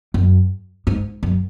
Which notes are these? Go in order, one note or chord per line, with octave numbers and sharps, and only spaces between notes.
F#2
G#2
F#2